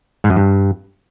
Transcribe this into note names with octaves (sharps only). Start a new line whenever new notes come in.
G#2
F#2
G2